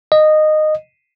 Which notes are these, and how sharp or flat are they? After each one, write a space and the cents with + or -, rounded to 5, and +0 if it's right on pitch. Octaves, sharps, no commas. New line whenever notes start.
D#5 -15